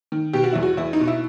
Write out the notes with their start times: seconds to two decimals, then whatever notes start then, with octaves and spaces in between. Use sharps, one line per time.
0.12 D#3
0.33 B2 G4
0.44 F#4
0.53 E2 E4
0.63 F#4
0.77 E2 E4
0.93 D#4
1.00 B2
1.07 E4